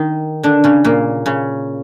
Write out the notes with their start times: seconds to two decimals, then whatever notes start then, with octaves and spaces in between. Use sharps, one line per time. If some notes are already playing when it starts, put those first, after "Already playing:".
Already playing: D#3 D#4
0.43 D3 D4
0.64 C#3 C#4
0.84 A#2 A#3
1.26 C#3 C#4